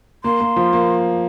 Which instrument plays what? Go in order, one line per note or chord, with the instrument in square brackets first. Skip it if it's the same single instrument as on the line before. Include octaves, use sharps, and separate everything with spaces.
[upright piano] A#3 [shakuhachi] C6
[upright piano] A#3
F3
A#3